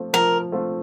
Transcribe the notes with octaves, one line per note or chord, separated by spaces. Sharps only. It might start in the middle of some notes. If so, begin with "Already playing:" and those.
Already playing: F3 A3 C4 F4
F3 A#4
A3 C4 F4